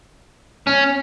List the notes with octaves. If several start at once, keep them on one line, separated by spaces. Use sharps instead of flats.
C#4